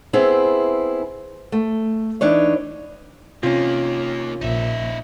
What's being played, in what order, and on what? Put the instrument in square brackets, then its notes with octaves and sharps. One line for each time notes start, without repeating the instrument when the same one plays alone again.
[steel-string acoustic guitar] B3 C4 E4 G#4
A3
E3 D4 D#4 C#5
[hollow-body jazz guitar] C3 C#4 [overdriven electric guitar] D#3 A#3 [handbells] F4
[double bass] A#1 [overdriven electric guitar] D#4 E5